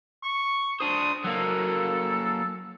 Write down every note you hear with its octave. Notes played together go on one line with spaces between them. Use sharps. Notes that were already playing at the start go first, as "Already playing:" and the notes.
C#6
D4 C5 D#6
F#3 A#3 A4